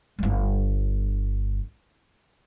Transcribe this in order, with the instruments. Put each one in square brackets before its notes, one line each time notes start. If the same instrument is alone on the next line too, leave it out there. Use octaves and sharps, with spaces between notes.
[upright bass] G1 G3